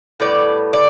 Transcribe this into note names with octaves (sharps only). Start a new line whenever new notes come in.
A2 G3 B3 D5
D5